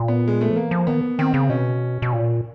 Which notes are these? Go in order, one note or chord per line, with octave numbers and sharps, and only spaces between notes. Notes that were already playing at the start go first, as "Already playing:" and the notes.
Already playing: A#2
B3
G#3
A3
F3
E3 A#3
F3
D#3 B3
D#3 C4
C#3
B2 C#4
B2
A#2